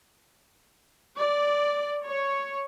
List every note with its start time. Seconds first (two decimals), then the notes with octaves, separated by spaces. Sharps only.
1.17 D5
2.03 C#5